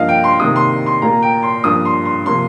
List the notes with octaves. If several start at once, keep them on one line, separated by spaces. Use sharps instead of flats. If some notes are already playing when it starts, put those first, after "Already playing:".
Already playing: G2 F3 A#3 D#5 F5
G5
C6
C3 D#3 A#3 D#6
C6
C6
A#2 A#3 A#5
G5
C6
G2 F3 A#3 D#6
C6
C6
C3 F3 A#3 C6